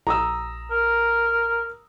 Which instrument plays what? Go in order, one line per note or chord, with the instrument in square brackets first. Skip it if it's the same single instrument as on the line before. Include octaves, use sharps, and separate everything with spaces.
[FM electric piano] A#1 [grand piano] A#5 D#6 E6
[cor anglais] A#4